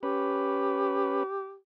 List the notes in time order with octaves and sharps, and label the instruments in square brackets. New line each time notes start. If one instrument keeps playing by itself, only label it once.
[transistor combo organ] C#4 B4 [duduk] G4